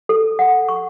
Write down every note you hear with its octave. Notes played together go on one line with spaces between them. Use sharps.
A4
F#5
C#6